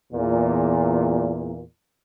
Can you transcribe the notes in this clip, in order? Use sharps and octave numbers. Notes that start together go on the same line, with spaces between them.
E2 A#2